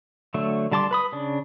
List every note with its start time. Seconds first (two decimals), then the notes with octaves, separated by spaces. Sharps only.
0.34 D3 F#3 A3
0.72 D3 G3 A5 C6 D6
0.91 B4 B5 D#6
1.13 C#3 D4